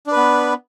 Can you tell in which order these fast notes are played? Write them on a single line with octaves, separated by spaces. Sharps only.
D4 B4 B3